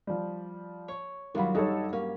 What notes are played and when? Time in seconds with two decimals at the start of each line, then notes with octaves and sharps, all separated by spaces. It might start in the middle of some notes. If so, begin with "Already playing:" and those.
0.07 F3 G3
0.88 C#5
1.35 G2 D#3 F#3 F4 B5
1.55 G2 D#4 A4 C#5
1.93 A#3 C#4